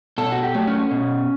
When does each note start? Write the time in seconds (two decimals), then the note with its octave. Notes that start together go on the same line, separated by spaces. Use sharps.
0.18 B2 A4
0.32 F#4
0.43 G4
0.55 F#3 A3
0.67 C#4
0.91 B2